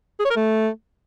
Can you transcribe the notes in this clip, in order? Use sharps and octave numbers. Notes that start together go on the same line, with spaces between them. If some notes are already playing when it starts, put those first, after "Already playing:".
G#4
C#5
A#4
A3